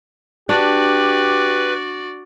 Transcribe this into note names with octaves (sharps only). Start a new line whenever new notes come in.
D4 F#4 G4 B4 D5